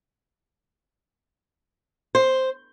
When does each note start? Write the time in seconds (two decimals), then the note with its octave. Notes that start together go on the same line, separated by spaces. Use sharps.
2.15 C5